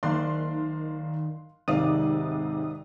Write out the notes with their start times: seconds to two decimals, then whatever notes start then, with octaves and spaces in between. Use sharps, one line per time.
0.03 F#1 D#3 A#3 D#4 D5 F5 C6 F#6
1.68 B1 G#2 C3 D#3 G4 D5 F5 D#6